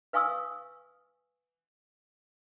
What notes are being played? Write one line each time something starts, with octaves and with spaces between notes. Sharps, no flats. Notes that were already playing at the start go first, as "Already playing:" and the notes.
B4 F5 G#5 C#6 D#6 E6